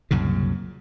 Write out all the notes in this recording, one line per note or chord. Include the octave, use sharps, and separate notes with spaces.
C2 F#2 A#2 C#3